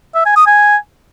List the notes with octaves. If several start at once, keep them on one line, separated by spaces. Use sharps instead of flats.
E5
G#5
D#6
G#5